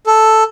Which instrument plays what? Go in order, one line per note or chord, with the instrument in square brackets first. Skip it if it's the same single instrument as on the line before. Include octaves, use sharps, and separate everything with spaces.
[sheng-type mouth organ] A4